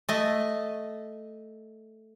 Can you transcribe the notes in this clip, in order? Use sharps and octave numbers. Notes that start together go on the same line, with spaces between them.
A3 D#5